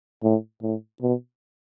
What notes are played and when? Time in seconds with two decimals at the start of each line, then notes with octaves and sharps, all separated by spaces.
0.24 A2
0.62 A2
1.02 B2